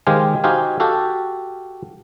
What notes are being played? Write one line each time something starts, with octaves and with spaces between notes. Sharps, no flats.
D#3 G#3 G4 C5 F5 G#5
D#4 F#4 G4 C5 F5 G#5
F#4 G4 A4 F5